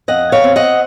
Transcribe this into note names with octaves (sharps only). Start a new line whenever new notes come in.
F2 D#5 F#5
C#5 F5
C4
D#5 F#5